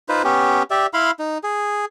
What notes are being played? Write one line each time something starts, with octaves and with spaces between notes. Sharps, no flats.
D#4 F4 B4 C5
B3 C#4 G4
G4 D5 E5
E4 F5 B5 C6
D#4
G#4